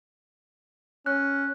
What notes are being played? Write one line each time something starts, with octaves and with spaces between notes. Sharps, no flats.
C#4 F#6